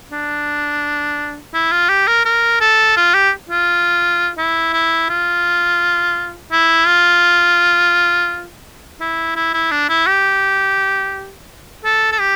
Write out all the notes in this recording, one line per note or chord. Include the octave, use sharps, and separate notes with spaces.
D4
E4
F4
G4
A#4
A#4
A4
F4
G4
F4
E4
E4
F4
E4
F4
E4
E4
E4
D4
E4
G4
A4
A4
G4